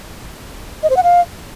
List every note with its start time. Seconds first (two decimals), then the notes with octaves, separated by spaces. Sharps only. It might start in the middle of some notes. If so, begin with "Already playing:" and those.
0.83 D#5
0.90 C5
0.97 F#5
1.03 F5